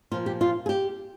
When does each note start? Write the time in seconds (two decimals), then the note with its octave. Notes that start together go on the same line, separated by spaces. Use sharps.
0.11 A#2 F3 F4
0.26 G4
0.41 F4
0.66 G#4
0.69 G4